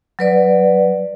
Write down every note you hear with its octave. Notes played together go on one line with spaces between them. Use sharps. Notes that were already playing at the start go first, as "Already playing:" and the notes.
F#3 B4 D5